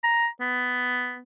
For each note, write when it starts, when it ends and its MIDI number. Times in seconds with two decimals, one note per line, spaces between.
0.04 0.28 82
0.41 1.21 59